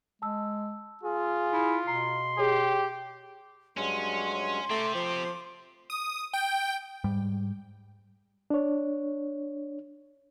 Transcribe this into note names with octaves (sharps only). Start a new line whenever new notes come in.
G#3 A5 E6
F4 G#4
E4
B2 A#5 C6
G4 G#4 C#5
G2 F#3 G#3 C#4 C6
A3 C4 G4 A5 A#5 D6
F3 D6
D#6
G5
G#2 G3
D4 C#5